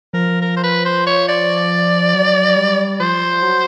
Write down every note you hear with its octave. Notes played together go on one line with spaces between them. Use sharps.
F3 A#4
A#4
C5
B4
C5
C#5
D5
F#3
G3
F3 C5
F#3